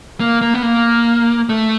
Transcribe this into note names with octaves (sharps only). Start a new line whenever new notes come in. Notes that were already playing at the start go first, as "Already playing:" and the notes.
A#3
A#3
B3
A#3
A3